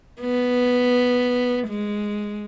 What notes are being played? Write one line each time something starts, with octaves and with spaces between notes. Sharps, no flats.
B3
G#3